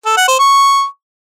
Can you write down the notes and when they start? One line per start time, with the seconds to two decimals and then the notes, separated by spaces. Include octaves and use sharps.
0.05 A4
0.17 F#5
0.28 C5
0.39 C#6